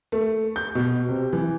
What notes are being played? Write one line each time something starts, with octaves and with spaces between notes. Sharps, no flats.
A3
G6
B2
C3
E3